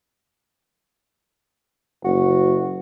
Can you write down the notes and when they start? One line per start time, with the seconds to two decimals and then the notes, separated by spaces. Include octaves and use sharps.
2.05 F#1 F#4